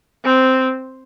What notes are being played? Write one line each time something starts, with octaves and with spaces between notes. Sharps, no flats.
C4